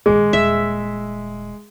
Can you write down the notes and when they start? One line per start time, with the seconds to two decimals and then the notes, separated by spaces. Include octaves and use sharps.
0.06 A#1 D#3 G#3 G#4
0.33 D#1 E5